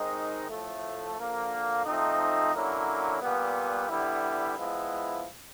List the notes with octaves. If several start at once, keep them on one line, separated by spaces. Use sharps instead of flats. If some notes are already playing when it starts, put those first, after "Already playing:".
Already playing: D#3 G#3 C4 D#4
A2 F3 A3
D3 F3 A#3
F3 A3 C4 D#4
D3 F#3 A#3 C#4 E4
A#2 G3 B3
D3 G3 B3 E4
F3 G#3 B3 E4